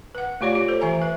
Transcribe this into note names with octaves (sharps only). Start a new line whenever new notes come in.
B4 F#5
A3 F4 G4 C#5 D5
F4 G4
A4 C5
E3 E5 G#5 A#5
B4 E5